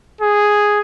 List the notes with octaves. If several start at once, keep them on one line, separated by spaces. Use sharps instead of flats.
G#4